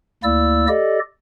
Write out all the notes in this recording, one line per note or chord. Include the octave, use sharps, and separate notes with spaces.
D2 A#3 E4 D5 E6
G4 A4 D5 D#5